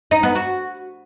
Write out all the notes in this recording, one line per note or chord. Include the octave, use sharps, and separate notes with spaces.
D#4
B3
F#4